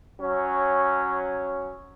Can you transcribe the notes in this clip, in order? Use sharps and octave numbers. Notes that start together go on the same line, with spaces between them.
F#3 C#4